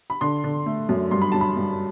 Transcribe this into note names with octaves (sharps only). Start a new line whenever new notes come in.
B5
D3 C6
D3
A3
F#2
G2 C6
B5
F#3 A5
B5
G2